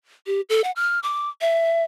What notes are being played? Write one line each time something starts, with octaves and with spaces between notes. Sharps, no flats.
G4
A4
F#5
F6
D6
E5